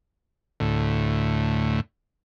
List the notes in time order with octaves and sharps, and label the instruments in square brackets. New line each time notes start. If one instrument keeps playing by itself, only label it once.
[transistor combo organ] D2 A2